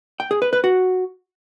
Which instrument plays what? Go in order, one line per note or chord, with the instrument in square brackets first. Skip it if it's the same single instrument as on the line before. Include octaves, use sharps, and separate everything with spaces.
[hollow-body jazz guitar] G5
G#4
B4
B4
F#4